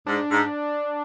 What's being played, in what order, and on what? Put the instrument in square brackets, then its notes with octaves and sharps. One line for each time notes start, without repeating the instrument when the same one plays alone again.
[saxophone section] G#2 [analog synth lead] D4
[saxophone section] G#2